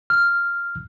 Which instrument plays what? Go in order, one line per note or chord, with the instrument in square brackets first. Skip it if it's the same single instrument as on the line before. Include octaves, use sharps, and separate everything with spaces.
[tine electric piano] F6